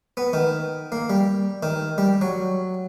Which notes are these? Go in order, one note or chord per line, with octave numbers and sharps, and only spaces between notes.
B3
D#3
A#3
G3
D#3
G3
F#3